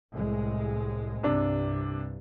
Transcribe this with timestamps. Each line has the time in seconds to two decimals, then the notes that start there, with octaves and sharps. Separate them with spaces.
0.11 C2 A2 G#3
1.23 C2 G2 C3 D4